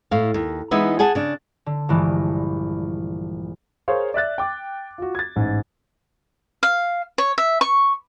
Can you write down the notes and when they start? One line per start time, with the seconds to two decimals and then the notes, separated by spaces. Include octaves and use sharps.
0.11 A2 F5
0.34 D#2
0.71 E3 G#3 B3 D#4 B4 E5
0.99 G#4 F#5 G#5 A5
1.15 C#3 D4
1.66 D3
1.89 A#1 G2 E3 G#3
3.88 G#4 A#4 C5 C#5 F5
4.14 D5 E5 F#6 A6
4.38 G5 D6
4.98 F4 F#4
5.15 G#6 A6
5.36 A1 G#2
6.63 F5
7.18 C#5
7.38 E5
7.61 C#6